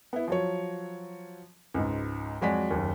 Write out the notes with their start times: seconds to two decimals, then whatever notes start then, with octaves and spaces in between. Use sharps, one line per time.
0.13 B3 E4
0.28 F3 F#3 C#5
1.74 C#2 G#2
2.41 F2 F#3 G#3 F#4 D5 B6
2.70 F#1 D#2